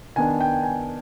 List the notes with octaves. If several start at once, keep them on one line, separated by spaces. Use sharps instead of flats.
D#3 B3 D4 G#5
G5
G#5